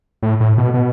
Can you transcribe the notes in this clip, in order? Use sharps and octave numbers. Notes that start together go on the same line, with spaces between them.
A2
A2
B2
B2